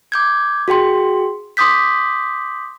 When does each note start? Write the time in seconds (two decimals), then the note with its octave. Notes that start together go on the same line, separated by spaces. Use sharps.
0.12 D6 G6 G#6
0.68 F#4 G#4 G5 C6
1.57 C6 D6 D#6 G6 B6